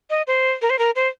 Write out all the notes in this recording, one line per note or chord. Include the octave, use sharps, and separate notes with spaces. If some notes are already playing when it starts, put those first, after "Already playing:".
D#5
C5
A#4
C5
A#4
C5